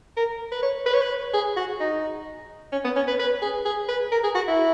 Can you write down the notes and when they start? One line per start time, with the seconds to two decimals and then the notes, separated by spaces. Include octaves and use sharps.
0.17 A#4
0.52 B4
0.62 C#5
0.86 B4
0.94 C#5
1.02 B4
1.33 G#4
1.57 F#4
1.80 D#4
2.72 C#4
2.84 B3
2.96 C#4
3.08 B4
3.19 B4
3.42 G#4
3.65 G#4
3.89 B4
4.12 A#4
4.24 G#4
4.35 F#4
4.48 E4